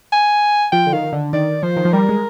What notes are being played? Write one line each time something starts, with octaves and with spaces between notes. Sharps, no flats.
G#5
F3 G5
D3
D#3 F5
D3
D#3 D5
F3 C5
D#3
F3
G3 A#4
G#3